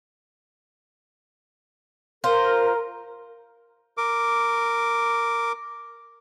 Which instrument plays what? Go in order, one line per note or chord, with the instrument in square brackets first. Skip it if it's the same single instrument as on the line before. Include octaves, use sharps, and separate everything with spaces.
[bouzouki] F4 C5 [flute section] A#4
[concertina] A#4 D6